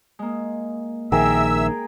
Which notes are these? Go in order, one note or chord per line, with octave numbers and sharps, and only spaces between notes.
G#3 A#3
A#1 D#3 G#4 A#4 E5 G5 E6